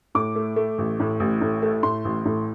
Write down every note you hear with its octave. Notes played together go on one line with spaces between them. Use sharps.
A2 D6
A3
A3
A1
A2
A1
A2
A3
A2 C6
A1
A2